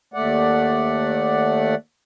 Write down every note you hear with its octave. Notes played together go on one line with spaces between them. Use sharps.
D#2 A3 D5 F#5